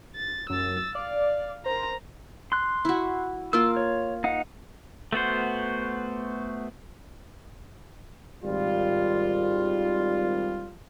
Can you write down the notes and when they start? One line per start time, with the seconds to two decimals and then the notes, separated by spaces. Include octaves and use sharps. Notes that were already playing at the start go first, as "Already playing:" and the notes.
0.16 A6
0.50 F#2 E6 A6
0.95 D5 F5
1.66 A#4 C5 A#5
2.52 C6 F#6
2.85 E4 F#4
3.53 A#3 F4 E6
3.77 C#5
4.24 D#4 F5 F#5
5.12 A3 B3 F#4 C5
8.44 G#1 G3 F4